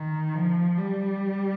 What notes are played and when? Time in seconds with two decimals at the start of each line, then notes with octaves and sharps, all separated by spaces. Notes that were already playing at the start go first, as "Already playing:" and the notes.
Already playing: D#3
0.35 F3
0.77 G3